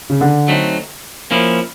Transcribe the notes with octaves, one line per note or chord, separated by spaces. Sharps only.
C#3
D3
F#3 A3 C4 D#4
F3 A#3 C#4 E4